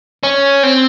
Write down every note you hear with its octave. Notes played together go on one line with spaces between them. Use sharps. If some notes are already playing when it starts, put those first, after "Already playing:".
C#4
C4